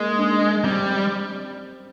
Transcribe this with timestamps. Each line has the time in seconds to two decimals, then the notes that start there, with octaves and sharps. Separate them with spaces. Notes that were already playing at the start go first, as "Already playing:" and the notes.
Already playing: G#3 A#3
0.18 D4
0.64 G3 C4